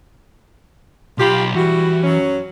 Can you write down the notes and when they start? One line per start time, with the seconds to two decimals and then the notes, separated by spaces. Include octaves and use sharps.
1.18 B1 F4 G4 B5
1.55 E3 G3 E4 F#4
2.03 F#2 F#3 C#4